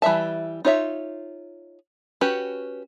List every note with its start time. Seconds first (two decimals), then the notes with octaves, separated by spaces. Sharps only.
0.02 E3 G3 E5 A5
0.65 D#4 F4 C#5 D#5 E5
2.21 C#4 F#4 G4 B4